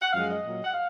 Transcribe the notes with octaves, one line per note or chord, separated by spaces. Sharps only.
F#5
F#2 F3 G#3 F5
D#5
A#2 F#3
F#5
F5